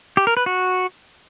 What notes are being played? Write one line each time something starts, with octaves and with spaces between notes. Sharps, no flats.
G4
A#4
B4
F#4